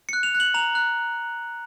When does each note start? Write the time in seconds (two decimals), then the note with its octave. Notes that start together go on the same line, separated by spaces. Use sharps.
0.09 F#6 C#7
0.23 F7
0.34 F#6
0.40 F#7
0.54 A#5 F7
0.75 F#6